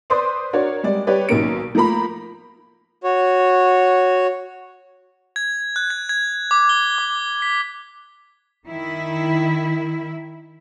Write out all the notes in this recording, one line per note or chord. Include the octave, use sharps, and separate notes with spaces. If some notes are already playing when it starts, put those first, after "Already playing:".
B4 C5 D5 C6 D6 D#6
D4 F#4 A#4 C#5 D5
G3 G#3 D5
G3 G4 B4 C#5 D5
B1 D#3 A#3 C#4 D7
F3 A3 A#3 A#5 B5
F#4 C#5
G#6
F#6
G#6
G#6
D6
G7
D6
B6
D#3 E4